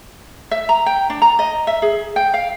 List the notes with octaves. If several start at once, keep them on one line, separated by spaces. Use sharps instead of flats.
E5
A#5
G5
D4
A#5
D#5
E5
G#4
G5
F5